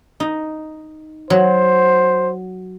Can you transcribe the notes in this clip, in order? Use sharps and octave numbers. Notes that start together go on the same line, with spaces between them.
D#4
F#3 C5